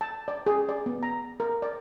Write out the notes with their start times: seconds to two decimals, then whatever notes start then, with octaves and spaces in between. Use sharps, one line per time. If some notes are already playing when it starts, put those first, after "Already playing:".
0.01 A5
0.28 D5
0.46 G#4
0.69 D5
0.86 B3
1.03 A#5
1.40 A#4
1.62 D5